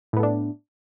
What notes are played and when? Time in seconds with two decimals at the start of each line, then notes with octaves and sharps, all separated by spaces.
0.13 A2
0.16 B3
0.20 A3
0.23 D4